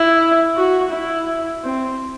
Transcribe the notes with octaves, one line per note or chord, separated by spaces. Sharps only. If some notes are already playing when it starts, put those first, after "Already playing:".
Already playing: E4
F#4
E4
C4